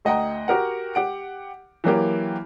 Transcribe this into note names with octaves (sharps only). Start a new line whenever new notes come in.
D2 D#5 F#5 G5 A#5
F#4 G4 A#4 F#5
G4 F#5 D7
E3 F#3 A#3 G4